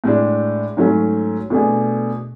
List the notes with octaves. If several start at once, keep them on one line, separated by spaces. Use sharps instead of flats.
A2 G#3 D4
G#2 F#3 A3 C#4
B2 A3 D4 G#4